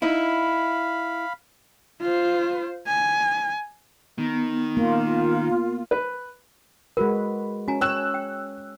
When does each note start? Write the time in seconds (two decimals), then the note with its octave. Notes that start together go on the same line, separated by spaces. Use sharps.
0.02 D#4 E4 F5 B5
2.01 F4 C5
2.86 G#5
4.18 D#3 B3
4.77 A#3 F4
5.91 B4
6.97 G#3 F#4 A#4 B4
7.68 C#4 F#4 G#5 A#5
7.81 C#4 C#5 E6 F#6 E7
8.14 G5